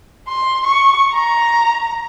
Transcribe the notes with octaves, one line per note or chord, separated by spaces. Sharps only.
C6
C#6
A#5